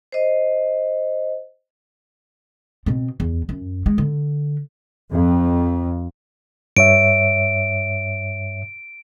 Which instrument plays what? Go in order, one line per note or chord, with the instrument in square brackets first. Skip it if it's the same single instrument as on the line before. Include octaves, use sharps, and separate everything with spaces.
[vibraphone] C5 D#5
[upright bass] B2 C4
E2
F#2
G#3
D3
[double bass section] F2
[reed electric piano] G2 C#5 E5 [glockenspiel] D7